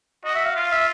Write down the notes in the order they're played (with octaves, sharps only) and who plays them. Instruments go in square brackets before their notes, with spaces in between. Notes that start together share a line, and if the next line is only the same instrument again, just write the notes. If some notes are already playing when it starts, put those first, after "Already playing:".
[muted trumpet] F#4 [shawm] D#5
[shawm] E5
F5
[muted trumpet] F4 [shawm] F5
[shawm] E5